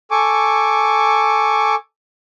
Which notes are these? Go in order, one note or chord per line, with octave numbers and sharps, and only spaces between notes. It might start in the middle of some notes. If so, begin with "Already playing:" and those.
A4 G#5 C#6 D6